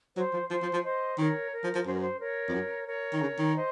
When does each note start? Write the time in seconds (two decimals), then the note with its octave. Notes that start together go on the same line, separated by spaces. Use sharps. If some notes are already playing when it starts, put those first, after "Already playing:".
0.17 F#3 C5
0.33 F3
0.50 F3 C5
0.62 F3
0.73 F3
0.84 C5 D#5
1.18 D#3 A#4 C#5
1.52 A#4
1.64 F3
1.75 F3
1.86 F#2 C5
1.93 A#4
2.01 C5
2.20 A#4 C#5
2.48 F2
2.54 F#2
2.88 A#4 C#5
3.13 D#3
3.22 C#3
3.39 D#3
3.56 C5 D#5